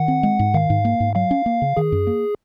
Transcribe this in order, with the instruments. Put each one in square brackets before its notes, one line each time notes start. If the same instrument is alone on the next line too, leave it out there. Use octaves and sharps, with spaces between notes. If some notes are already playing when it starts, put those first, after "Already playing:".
Already playing: [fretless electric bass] D#3 [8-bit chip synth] F#5
[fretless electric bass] C4
G#3
G#2
[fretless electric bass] D#3 [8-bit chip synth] F5
[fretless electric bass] G#2
A#3
G#2
[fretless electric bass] F#3 [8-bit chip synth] F5
[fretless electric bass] C#4
A#3
C#3
[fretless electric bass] D#3 [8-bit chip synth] G#4
[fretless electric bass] F#2
A#3